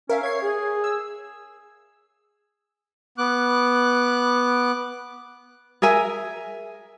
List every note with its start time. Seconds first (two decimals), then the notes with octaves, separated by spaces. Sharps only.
0.09 C#4 A#4 E5 F5
0.23 C#5 G#6 C7
0.42 G#4
0.84 E6
3.18 B3 D6 F#6
5.82 G#4 A#4 E5 G#5